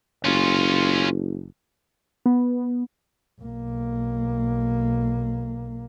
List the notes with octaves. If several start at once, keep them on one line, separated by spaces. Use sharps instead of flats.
F#1 C#4 F4
B3
B1 A#3